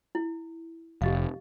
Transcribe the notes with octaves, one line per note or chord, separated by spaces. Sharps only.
E4
F1 G4 D#5 F5